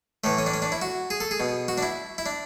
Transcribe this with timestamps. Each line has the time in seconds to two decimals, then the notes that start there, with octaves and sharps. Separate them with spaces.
0.24 A2 E3 A3
0.38 C#4
0.46 D4
0.54 C#4
0.62 D4
0.72 E4
0.82 F#4
1.10 G#4
1.20 A4
1.31 G#4
1.40 B2
1.68 F#4
1.78 D4
1.83 E4
2.18 E4
2.26 D4